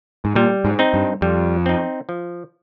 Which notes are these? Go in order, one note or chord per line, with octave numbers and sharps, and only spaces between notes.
G#2
A#2 G3
G#2
C4 D#4
G2
F2 G3
C4 D#4
F3